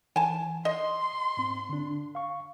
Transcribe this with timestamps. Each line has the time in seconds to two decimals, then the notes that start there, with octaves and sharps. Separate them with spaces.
0.16 E3 G#5 A5
0.65 D#5 C6 D#6
1.37 G#2 C4
1.69 D3 D4
2.15 F5 C#6